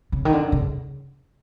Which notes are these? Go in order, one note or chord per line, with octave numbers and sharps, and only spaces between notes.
C#3
D#3
D3
C#3